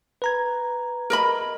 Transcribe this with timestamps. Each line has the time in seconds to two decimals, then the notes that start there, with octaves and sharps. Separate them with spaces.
0.22 B4 A#5 G#6
1.10 A#4 D#5 B5